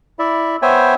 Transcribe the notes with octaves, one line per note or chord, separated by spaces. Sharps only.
E4 D5 E5
B3 C5 C#5 E5 G5 G#5